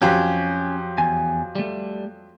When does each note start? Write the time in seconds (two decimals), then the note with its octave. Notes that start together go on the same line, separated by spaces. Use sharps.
0.02 F2 F#3 C#4 G4
0.98 E2 G#5
1.55 G3 A3